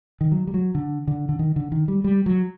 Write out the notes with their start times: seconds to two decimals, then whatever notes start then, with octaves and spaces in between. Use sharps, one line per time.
0.21 D#3
0.32 F#3
0.47 G3
0.54 F#3
0.75 D3
1.07 D3
1.29 D3
1.39 D#3
1.56 D3
1.72 D#3
1.88 G3
2.04 G3
2.26 F#3